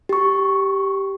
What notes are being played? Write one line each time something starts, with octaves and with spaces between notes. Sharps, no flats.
G4 C#6